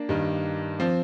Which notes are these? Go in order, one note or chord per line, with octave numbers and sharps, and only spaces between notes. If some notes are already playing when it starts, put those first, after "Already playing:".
Already playing: A#3 D4
G2 D#3
F3 C4